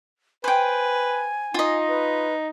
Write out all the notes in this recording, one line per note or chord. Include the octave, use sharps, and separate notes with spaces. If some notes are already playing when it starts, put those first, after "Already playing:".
B4 C5 G5 G#5
D#4 F4 D#5
B4